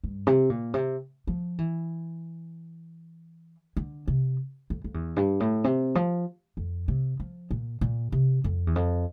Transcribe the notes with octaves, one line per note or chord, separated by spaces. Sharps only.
G2
C3
A#2
C3
F3
E3
D3
C3
F2
F2
E2
G2
A2
C3
F3
F2
C3
F3
A#2
A#2
C3
F2
E2
F2